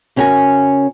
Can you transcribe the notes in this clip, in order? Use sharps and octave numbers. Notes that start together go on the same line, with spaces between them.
C#3 C#4 F4 F#4 A#4 G#5